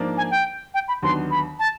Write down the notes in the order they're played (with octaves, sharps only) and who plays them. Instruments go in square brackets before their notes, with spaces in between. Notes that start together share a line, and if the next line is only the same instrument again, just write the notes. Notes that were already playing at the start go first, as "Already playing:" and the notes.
Already playing: [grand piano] G#2 F3 A#3 D4
[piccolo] G#5
G5
G5
B5
[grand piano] D#2 D3 F#3 B3 D4 [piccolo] C6
[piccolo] B5
A5